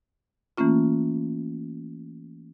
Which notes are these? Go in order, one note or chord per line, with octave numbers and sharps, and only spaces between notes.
E3 A3 A#3 C#4 F4